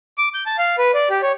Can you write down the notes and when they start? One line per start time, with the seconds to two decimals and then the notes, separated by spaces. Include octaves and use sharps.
0.18 D6
0.34 G6
0.46 A5
0.58 F5
0.78 B4
0.94 D5
1.10 G4
1.22 C#5